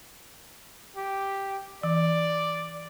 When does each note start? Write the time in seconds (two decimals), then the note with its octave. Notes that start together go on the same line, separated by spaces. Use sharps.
0.97 G4
1.83 E3 D5